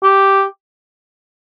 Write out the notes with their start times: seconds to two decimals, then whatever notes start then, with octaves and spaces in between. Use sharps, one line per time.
0.03 G4